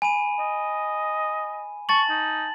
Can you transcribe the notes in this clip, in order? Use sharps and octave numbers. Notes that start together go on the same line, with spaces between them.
G#5 B5 D#7
D#5
A5 C#6 A6 F#7
D#4